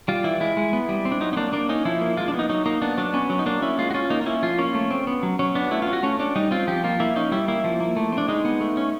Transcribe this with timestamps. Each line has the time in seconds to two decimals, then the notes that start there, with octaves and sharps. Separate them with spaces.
0.08 G3 F4
0.24 E3 E4
0.41 G#3 E4
0.57 G#3
0.73 B3
0.89 G3
1.05 C4
1.12 D4
1.21 F#3 D#4
1.33 D#4
1.37 A#3 D4
1.53 A#3 D4
1.69 C#4 D#4
1.85 F3 E4
2.01 A#3
2.17 G#3 F4
2.28 D4
2.34 B3
2.39 D#4
2.49 F#3 D#4
2.66 A#3 D#4
2.82 B3 D4
2.97 F#3 D4
3.13 B3 C#4
3.30 F#3
3.39 D#4
3.46 A#3 D4
3.62 C#4 E4
3.78 G#3 F4
3.90 F#4
3.94 C#4 F4
4.10 A#3 D#4
4.21 F4
4.26 C#4 E4
4.43 F3 F4
4.58 A#3 C#4
4.74 A3
4.90 C4
5.07 B3
5.23 F#3
5.39 F#3 C#4
5.55 B3 D4
5.71 A3 E4
5.82 F4
5.87 C#4
5.93 F#4
6.03 A3 C#4
6.19 C#4 D4
6.36 G3 D#4
6.51 C4 F4
6.67 F3 G4
6.84 A#3 F4
7.00 A#3 E4
7.16 C#4 D#4
7.31 G3 E4
7.48 A#3 E4
7.64 F3
7.80 A#3
7.97 A3
8.12 C4
8.18 D4
8.28 G#3 D#4
8.45 B3
8.61 A3
8.77 C#4